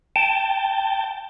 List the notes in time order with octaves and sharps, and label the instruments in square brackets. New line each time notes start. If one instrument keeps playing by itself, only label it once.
[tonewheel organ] G5 A5